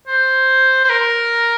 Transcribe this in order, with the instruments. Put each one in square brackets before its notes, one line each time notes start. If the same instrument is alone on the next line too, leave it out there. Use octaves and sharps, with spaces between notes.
[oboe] C5
C5
A#4